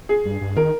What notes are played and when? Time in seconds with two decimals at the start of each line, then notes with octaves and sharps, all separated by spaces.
0.09 G#4
0.25 G2
0.41 G2
0.57 D#3 A#4